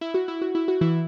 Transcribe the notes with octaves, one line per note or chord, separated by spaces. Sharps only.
E4
F#4
E4
F#4
E4
F#4
E3 E4